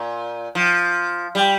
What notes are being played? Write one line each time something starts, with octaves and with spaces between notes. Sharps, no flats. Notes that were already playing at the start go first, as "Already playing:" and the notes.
Already playing: A#2
F3
G3